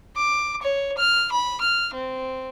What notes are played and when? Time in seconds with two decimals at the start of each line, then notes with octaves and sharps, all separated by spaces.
0.16 D6
0.62 C#5
0.98 F6
1.32 B5
1.61 F6
1.93 C4